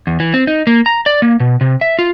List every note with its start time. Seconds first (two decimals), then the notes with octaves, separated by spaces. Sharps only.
0.07 E2
0.20 E3
0.34 C4
0.47 D#4
0.67 A#3
0.86 A#5
1.06 D5
1.22 A#3
1.40 B2
1.61 C3
1.81 E5
1.99 F4